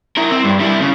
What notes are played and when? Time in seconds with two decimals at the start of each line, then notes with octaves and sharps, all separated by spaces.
0.17 E4 A#4
0.32 C4
0.45 G2
0.60 G3 E4
0.81 C#3